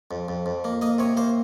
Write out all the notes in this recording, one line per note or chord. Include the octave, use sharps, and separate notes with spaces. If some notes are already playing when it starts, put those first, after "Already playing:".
F2
F2
F2
A#3
A#3 D#5
C3 C#5
A#3 C5